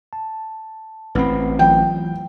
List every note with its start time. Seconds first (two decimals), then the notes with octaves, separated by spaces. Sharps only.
0.13 A5
1.15 A1 C4 B4 F#5 B5
1.59 E3 F#3 F4 G5